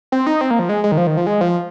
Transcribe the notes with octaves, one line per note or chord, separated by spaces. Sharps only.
C4
D#4
C4
A#3
F3
G#3
G#3
D#3
F3
D#3
F3
G#3
F3